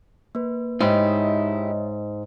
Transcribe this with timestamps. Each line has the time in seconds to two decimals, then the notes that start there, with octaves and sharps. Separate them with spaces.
0.35 A#3 B4
0.81 G#2 D#4 E4 G4 C#5 D#5 E5